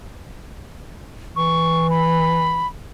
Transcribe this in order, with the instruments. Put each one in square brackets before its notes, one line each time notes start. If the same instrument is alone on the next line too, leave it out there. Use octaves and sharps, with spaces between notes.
[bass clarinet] E3 [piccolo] C#6
[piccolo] B5